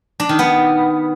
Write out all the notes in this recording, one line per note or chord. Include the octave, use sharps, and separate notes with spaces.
D4
D#3
B3